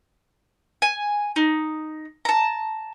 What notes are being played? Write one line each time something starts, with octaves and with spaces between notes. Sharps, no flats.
G#5
D#4
A5 A#5